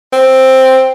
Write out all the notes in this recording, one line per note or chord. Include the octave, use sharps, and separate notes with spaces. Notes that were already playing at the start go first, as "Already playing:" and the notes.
C4